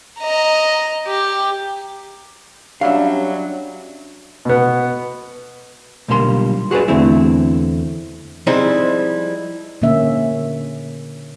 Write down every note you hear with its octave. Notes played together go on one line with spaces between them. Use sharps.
D#5 A#5
G4
F#3 G3 C#4 D4 E5 F5
B2 B3
B1 A#2 D3 G3 A#3 C6
F#4 G#4 A#4 B4 D5
E2 D3 A3 C4 E4
F3 G3 G#3 C4 D#4 E4
A#2 D3 A#3 C#4 E5